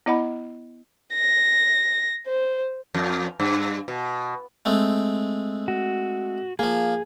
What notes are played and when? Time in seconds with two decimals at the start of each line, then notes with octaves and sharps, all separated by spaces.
0.06 B3 E4 D#5 F#5 B5
1.15 A#6
2.27 C5
2.95 F2
3.40 G2
3.88 B2
4.65 G#3 A3 C4
5.68 F#4
6.59 F3 A#3 G#4